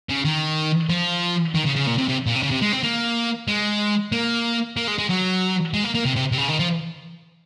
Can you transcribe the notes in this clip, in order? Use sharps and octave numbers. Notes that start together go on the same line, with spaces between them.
C#3
D#3
F3
D#3
C#3
C#3
A#2
C3
C3
A#2
C3
C#3
C3
G#3
C4
A#3
G#3
A#3
A#3
G#3
G#3
F#3
G#3
A#3
A#3
C3
C3
C3
C#3
D#3
F3